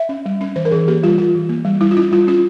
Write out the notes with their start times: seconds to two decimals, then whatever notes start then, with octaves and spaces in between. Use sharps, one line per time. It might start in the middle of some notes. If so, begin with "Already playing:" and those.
Already playing: E5
0.09 C#4
0.26 G3
0.41 C#4
0.56 E3 C5
0.65 A#4
0.71 E3 G#4
0.88 A#3 G4
1.03 G3 F4
1.18 E3 F4
1.35 E3
1.49 A#3
1.65 G3
1.81 G3 E4
1.91 F4
1.97 C#4 E4
2.12 G3 F4
2.27 C#4 F4